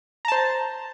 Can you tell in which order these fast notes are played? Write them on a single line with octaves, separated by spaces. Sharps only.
A#5 A5 C5